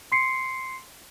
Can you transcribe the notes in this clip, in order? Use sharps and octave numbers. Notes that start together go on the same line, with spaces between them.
C6 C7 C#7